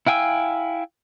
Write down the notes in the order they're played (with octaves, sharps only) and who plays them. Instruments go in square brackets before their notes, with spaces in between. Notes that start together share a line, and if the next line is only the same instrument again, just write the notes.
[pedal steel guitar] E4 F5 G5 G#5 E6